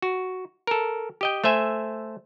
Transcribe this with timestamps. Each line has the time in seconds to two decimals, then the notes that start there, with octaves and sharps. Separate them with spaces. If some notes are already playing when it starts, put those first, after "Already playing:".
0.02 F#4
0.67 A4 A#4
1.21 G4 D#5 G5
1.44 A3 C5 E5 G#5